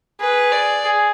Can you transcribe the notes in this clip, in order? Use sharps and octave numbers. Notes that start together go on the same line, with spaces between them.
G#4 B4
D5
G#4